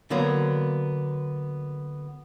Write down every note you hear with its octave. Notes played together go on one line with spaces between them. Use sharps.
D3 F#3 A#3 B3